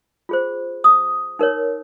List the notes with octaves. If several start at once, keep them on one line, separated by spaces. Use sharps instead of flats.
F4 G#4 C5
D#6
D#4 A#4 C#5